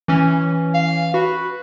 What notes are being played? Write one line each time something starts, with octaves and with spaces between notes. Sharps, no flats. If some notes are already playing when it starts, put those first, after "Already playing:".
E3 C#4
F5
F#4 B4